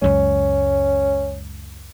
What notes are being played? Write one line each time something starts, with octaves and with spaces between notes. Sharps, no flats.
C#2 F#2 G#3 C#4